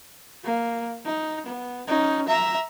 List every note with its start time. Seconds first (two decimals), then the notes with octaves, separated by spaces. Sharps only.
0.44 A#3
1.04 D#4
1.46 B3
1.87 C#4 D#4
2.28 E5 A#5